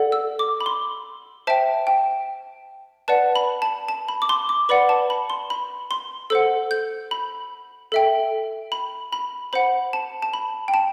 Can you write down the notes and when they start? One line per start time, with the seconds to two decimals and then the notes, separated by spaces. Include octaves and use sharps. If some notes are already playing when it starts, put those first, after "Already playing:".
Already playing: A4 D5 F#5
0.12 E6
0.39 D6
0.61 B5
0.66 C6
1.47 C5 E5 G5 A5
1.87 G5
3.08 B4 D5 F#5 A5
3.36 B5
3.62 A5
3.89 A5
4.08 B5
4.22 D6
4.29 C6
4.49 D6
4.69 B4 D5 F#5 B5
4.89 A5
5.10 B5
5.30 C6
5.50 B5
5.91 C6
6.30 A4 C5 F#5 E6
6.71 G6
7.11 B5
7.92 A4 E5 G5
8.72 B5
9.12 B5
9.53 C5 F#5 B5
9.93 A5
10.22 A5
10.33 B5
10.68 G5
10.74 A5